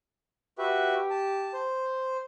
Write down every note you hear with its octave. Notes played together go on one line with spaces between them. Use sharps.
F#4 G4 B4 E5
A5
C5